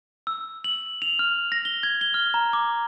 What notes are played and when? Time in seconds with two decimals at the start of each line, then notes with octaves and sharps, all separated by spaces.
0.27 E6
0.64 F#7
1.02 F7
1.19 F6
1.52 A#6
1.65 G7
1.83 G#6
2.01 G7
2.14 F6
2.34 A#5
2.53 D6